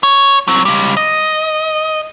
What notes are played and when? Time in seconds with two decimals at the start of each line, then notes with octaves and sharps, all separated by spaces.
0.03 C#5
0.48 F#3 C4
0.65 C#2 G3
0.97 D#5